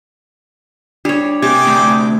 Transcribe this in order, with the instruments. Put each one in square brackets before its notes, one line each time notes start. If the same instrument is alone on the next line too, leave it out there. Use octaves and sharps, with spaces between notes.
[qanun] G3 C#5 [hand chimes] D4
[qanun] C3 C#6 [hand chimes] A#3 G4 G#6 [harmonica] G#4 G5 D6
[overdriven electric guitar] D2